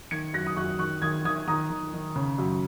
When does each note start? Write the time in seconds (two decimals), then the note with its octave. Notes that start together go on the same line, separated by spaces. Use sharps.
0.11 D#3 G#6 C#7
0.34 F#2 F#6 A#6
0.47 D#6
0.56 F#2 C#6 F#6
0.79 D#3 C#6 F#6
1.02 D#3 D#6 G#6
1.25 D#3 D#6 G#6
1.47 D#3 A#5 D#6
1.70 D#3
1.94 D#3
2.16 C#3
2.38 F#2